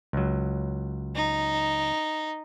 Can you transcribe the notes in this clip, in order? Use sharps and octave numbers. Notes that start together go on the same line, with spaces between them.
C#2 F#3
D#4